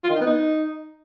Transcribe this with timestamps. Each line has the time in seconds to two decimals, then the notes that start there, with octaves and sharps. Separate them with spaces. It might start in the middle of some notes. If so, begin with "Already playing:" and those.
0.04 F4
0.10 D#3
0.15 D#4
0.21 B3
0.27 D#4